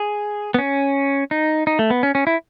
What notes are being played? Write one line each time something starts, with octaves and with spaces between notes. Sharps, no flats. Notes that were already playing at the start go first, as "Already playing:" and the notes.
Already playing: G#4
B3
C#4
D#4
D#4
A3
B3
C#4
C#4
E4